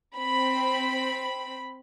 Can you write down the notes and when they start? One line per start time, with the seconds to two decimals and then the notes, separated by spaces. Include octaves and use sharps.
0.17 C4 B5